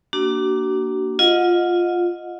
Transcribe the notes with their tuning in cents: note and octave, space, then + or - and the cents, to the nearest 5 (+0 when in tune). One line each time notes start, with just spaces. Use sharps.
A#3 +0 D4 +0 F#4 +40
F4 +0 D#5 +0 F#5 -30